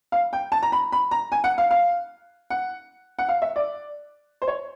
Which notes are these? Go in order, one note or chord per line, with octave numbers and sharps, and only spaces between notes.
F5
G5
A5
A#5
B5
B5
A#5
G#5
F#5
F5
F5
F#5
F#5
F5
E5
D5
C5
C#5